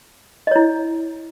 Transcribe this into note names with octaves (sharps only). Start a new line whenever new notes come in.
E4 C#5 D#5